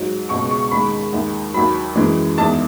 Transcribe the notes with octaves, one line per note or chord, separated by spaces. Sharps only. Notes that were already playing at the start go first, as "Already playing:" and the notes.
Already playing: G#2 F#3
C#2 B2 G#3 C#6
C#6
D#2 D#3 G#3 B5
D#2 D#3 G#3
D#2 D#3 F#3 B5
F#2 E3 G#3
E2 D#3 G#3 A5